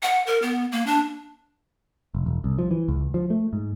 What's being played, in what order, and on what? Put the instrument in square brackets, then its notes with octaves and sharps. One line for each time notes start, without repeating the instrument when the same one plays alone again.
[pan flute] F#5
A#4
B3
A#3
D4
[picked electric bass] F1
E1
C2
F3
E3
C#2
F3
A3
G#2